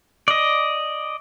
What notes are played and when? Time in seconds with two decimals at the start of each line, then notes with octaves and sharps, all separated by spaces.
0.28 D5 D#5